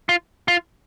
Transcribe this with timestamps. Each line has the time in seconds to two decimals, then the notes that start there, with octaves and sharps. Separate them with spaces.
0.09 F4
0.48 F4